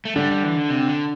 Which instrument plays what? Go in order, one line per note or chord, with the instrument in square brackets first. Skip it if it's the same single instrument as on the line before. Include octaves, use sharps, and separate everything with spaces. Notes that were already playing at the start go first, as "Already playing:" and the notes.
[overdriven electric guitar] A3
[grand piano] D3 D4 [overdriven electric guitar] G3
[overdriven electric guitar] G3
E3
D3
C3
D3